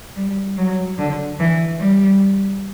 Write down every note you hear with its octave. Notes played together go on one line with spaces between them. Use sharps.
G3
F#3
D3
E3
G3